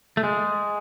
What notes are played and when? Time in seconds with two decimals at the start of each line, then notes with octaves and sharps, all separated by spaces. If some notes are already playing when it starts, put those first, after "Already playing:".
0.17 A3
0.23 G#3